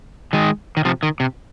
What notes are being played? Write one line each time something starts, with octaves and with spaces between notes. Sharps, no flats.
D#3 G#3
D#3
C3 F3
D#3
C3